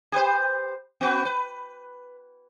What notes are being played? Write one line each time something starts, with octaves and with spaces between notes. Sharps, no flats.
G4 B4 C5
B3 F#4 B4
B4